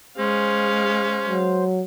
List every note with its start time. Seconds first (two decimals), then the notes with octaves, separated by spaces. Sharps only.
0.18 G#3 C#4 C5 F5
1.28 F#3